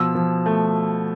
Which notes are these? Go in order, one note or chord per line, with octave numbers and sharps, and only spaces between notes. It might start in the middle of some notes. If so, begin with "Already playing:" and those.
Already playing: B2 F3 E6
F3
A3